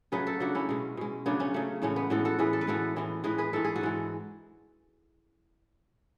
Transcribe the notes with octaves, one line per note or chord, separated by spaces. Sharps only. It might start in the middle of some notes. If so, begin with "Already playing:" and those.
C#3 F#3 A3 G#4 B4
F#4 A4
C#3 F#3 A3 D4 F#4
C#4 E4
B2 G#3
B2 G#3
C#3 F#3 A3 B3 D4
A3 C#4
C#3 F#3 A3
A2 E3 G#3 A3 C#4
B3
A2 E3 G#3 F#4 A4
F#4 A4
A2 E3 G#3 G#4 B4
A4
B4
A2 E3 G#3 F#4 A4
A2 E3 G#3
A2 E3 G#3 G#4 B4
G#4 B4
G#2 E3 G#3 A4
G#4
F#4 A4
G#2 E3 G#3